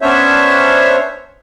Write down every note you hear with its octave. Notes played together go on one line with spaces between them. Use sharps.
B3 C#4 D4 C5 C#5 E5